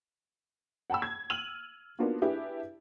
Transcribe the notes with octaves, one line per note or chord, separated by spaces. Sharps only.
F#5 G5 A5 B5 E6
G#6
E6 F6 D#7 F7 F#7
A#3 B3 D4 D#4 F4 F#4
D4 E4 G4 G#4 B4